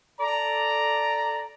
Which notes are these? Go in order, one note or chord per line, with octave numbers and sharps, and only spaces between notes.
A4 D5 A#5